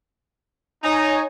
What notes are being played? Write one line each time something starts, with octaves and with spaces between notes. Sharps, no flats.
D#4 C#5 G#5 A#5